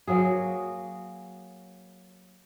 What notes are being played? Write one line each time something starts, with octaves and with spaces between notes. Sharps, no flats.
F#3 A#3 G#4